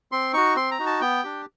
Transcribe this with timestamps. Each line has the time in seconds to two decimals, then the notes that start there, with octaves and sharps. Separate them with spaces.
0.12 C4 C6
0.33 D#4 F#4 C#6
0.56 C4 C6
0.71 A#5
0.79 D#4 F#4
0.86 A5
1.01 B3 G5
1.24 D4 G4